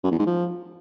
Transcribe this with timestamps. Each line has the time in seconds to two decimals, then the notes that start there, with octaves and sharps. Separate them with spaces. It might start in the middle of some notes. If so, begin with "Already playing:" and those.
0.03 F#2
0.11 E2
0.19 G#2
0.26 F3